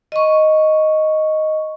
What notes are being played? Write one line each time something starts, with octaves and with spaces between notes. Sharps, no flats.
D#5 C#6